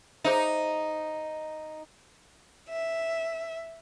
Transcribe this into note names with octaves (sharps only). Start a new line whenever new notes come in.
D#4 G#4 C5 E5
E5